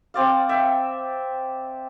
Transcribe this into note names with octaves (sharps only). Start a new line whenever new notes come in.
C4 D5 F5
E5 G5